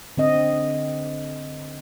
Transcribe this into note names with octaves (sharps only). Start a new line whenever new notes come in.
D3 C4 D#5